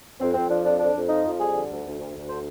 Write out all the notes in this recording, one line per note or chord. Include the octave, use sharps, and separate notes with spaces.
F2 C4
F2 C4
F3 D4
F2 D4
F2 D4
F2
F3 D#4
F2
G3 G#4
D3
D2
D2
D2
D2
D3 C5